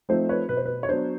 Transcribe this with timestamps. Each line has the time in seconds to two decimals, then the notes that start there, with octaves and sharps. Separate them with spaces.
0.09 F3 A3 C4 D#4 C5
0.29 B4 C#5
0.49 B2 B4
0.57 C5
0.66 B4
0.83 C#5
0.89 F#3 B3 D4 C5